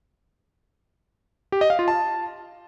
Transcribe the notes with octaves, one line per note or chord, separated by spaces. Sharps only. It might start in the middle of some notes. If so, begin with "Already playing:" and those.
G4
D#5
F5
F4
A5